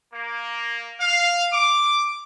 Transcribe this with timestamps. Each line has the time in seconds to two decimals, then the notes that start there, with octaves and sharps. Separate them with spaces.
0.13 A#3
1.01 F5
1.53 D6